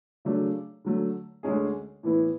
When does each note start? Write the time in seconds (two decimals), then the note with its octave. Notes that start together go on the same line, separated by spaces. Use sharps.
0.25 C#3 F#3 A3 D4
0.85 D3 F#3 A3
1.43 D2 D3 G#3 C#4 G#4
2.03 A2 E3 B3 E4